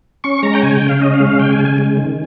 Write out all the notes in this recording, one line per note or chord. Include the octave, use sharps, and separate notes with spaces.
C#4 C#6
G#3 A#5
G5
C#3 G#5
G5
C#3
F5
C#4 D#5
F5
G#3
F5
C#3 G5
G#5
C#3
G#5
G#3
D#3